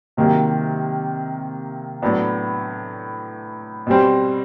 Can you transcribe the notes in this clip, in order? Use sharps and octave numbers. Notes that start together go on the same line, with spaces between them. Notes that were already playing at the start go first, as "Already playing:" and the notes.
C3 D#3 F#3 A#3
A2 F#3 B3 D4
B2 G3 C4